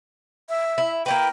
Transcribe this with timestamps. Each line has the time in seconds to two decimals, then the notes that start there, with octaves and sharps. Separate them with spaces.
0.49 E5
0.78 E4
1.06 A#3 E4 B4 G5